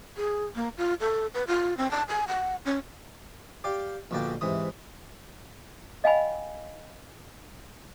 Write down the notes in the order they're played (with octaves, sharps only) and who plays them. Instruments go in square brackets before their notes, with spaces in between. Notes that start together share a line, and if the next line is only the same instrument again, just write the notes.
[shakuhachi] G#4
A#3
F4
A4
B4
F4
C4
A5
G#5
F#5
C#4
[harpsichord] G4 D5 F5 G5
A#1 B2 D3 A#3 D5 G5
G#2 C3 E3 D#6
[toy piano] D#5 F5 G5 G#5 B5